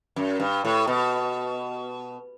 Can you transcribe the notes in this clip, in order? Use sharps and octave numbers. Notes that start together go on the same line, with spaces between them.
F#2
G2
A2
B2